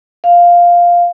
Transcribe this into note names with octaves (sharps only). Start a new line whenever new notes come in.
F5